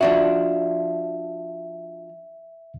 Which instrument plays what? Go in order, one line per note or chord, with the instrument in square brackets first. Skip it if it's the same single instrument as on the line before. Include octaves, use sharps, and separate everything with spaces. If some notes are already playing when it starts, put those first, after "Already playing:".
[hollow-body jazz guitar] F3 D4 F#4 [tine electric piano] E5